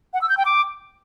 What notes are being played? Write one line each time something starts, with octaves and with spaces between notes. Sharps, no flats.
F#5
E6
G6
G5
D6